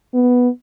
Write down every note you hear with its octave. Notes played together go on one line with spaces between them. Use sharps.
B3